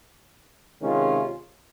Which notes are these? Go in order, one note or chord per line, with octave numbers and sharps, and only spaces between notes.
C3 D#3 G#3 C#4 F4